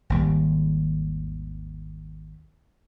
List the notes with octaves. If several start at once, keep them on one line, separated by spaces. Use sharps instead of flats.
G#1 D#2 G3